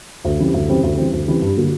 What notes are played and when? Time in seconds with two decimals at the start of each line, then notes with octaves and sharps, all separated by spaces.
0.24 D2
0.39 C#3 E3 G3 C4
0.54 D2
0.68 C#3 E3 G3 C4
0.83 D2
0.98 C#3 E3 G3 C4
1.13 D2
1.28 C#3 E3 G3 C4
1.42 G2
1.57 D3 F#3 A#3